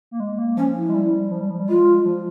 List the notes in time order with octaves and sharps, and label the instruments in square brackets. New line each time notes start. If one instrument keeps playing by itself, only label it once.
[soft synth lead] A#3
G#3
A#3
[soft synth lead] F3 [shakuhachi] C#4
[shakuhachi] E4
[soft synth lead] G#3
G3
G3
F3
G3
F3
G3
[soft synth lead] G#3 [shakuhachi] F4
[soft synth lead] F3